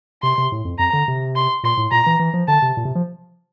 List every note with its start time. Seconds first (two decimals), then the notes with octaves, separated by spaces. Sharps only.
0.23 C3 C6
0.38 C3
0.52 A2
0.65 F2
0.79 F2 A#5
0.93 D3
1.08 C3
1.36 C6
1.63 A#2 C6
1.77 A2
1.91 A#2 A#5
2.06 E3
2.19 E3
2.34 F3
2.48 D3 A5
2.62 C3
2.77 A#2
2.85 C3
2.95 F3